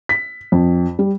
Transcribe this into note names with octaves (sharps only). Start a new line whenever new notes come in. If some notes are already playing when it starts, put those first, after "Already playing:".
B6
F2
G3